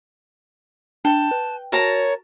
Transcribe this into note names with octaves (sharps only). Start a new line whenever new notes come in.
D4 G5 A5
B4
F#4 A#4 C#5 A5 A#5